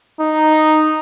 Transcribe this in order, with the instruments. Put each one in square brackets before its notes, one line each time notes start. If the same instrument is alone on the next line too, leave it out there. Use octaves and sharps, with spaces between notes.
[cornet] D#4